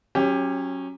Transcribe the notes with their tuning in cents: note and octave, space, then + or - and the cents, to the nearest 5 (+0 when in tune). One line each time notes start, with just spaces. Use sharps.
F#3 +0 C#4 -15 G4 +15